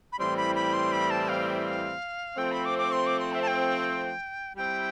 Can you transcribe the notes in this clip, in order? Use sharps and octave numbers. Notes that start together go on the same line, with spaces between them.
B5
A2 E3 G3 C4 C6
B5
B5
C6
B5
A5
F5
E5
F5
F3 A3 C4 G5
B5
D6
D6
C6
D6
C6
E5
A5
G5
G3 C4 E4 G5